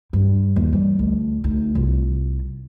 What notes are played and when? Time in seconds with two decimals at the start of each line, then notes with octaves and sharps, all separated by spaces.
0.13 G2
0.56 D#2
0.73 E3 G3
0.99 D2
1.44 D2 D#4
1.75 C2 F4